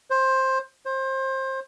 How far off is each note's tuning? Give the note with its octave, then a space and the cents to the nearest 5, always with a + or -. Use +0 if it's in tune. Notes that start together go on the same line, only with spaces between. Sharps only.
C5 +15
C5 +25